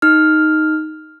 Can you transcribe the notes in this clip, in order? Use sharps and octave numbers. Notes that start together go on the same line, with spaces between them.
D#4 F6